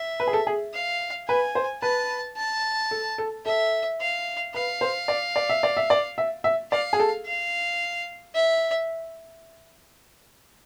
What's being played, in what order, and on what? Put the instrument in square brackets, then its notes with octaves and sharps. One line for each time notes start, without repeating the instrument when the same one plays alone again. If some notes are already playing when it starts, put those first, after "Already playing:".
Already playing: [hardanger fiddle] E5
[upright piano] B4
G#4
A4
G#4
[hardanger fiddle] F5
[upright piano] B4 [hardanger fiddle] G#5
[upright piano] C5
[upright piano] B4 [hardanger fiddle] A5
[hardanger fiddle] A5
[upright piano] A4
A4
[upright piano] A4 [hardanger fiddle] E5
[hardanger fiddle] F5
[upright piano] B4 [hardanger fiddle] F5
[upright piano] C5
D5
D5
E5
D5
E5
D5
E5
E5
[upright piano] D5 [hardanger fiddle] F5
[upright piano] G#4
A4
[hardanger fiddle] F5
E5